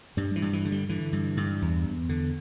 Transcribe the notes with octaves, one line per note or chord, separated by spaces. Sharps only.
G2 G3
E3
G2
E3
D3
G3
D3 E3
G2
G2
E2
E2
D3